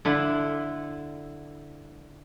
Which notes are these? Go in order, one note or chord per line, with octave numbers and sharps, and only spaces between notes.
D3 E4 F4